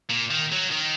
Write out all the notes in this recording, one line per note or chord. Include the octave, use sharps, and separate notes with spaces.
A#2
D#3
F#3
D#3